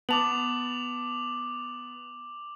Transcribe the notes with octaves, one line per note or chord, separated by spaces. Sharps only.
B3 A5 D6 F7 F#7